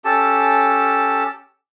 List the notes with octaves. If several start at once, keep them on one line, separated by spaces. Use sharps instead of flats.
C#4 G4 A4 A5